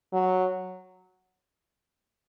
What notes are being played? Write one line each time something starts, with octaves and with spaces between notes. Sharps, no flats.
F#3